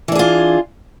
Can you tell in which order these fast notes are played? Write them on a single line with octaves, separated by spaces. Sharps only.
E3 D4 G#4 F4